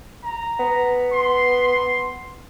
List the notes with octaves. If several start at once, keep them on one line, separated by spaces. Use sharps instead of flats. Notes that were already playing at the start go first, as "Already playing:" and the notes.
A#5
B3
C6